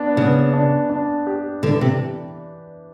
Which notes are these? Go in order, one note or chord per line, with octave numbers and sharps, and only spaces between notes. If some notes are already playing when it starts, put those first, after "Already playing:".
Already playing: B3 D4
C#3 B3
D4
D4
G4
D3 E3
C3